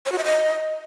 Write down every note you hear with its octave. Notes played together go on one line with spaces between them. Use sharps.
C#5
F#4
E5
D#5